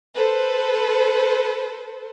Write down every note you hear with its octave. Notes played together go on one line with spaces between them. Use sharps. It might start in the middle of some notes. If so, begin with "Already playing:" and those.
A4 B4 C5